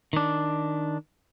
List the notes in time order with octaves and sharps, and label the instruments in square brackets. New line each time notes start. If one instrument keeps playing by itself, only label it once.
[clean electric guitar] D#3 D4